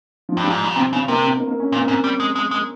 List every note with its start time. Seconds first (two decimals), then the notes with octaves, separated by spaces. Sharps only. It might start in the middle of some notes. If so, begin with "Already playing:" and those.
0.29 F3
0.37 G2
0.44 G3
0.50 G#2
0.64 A#2
0.76 C3 C4
0.92 C#3 C4
1.08 C3 A#3
1.24 C4
1.37 A#3
1.48 A#3
1.60 C#4
1.72 A#2 C4
1.80 A#3
1.87 G#2 C4
2.04 G3
2.20 G#3
2.36 G#3
2.51 G#3